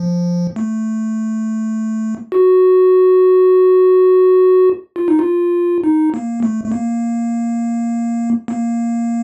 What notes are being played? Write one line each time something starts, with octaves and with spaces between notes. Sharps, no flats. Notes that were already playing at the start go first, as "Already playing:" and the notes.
Already playing: F3
A3
F#4
F4
D#4
F4
D#4
A#3
A3
A3
A#3
A#3